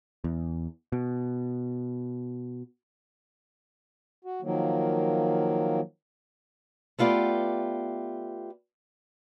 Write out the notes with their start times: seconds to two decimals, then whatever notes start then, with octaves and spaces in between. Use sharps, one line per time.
0.24 E2
0.92 B2
4.25 F#4
4.42 D#3 F3 F#3 A#3
6.98 A3 B3 F4 G4 D5